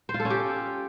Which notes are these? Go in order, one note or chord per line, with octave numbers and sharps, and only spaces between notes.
C5
F4
A4
C#4
G4